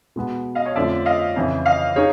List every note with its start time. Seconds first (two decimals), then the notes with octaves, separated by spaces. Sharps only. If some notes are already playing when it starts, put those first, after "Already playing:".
0.16 B2 G#3 B3
0.55 D#5 F5
0.65 C#5 D#5
0.75 F2 D3 F3 A3 C#4 D5 E5
1.06 D#5 F5
1.36 F2 C#3 E3
1.66 D#5 F5
1.96 D#4 G#4 C#5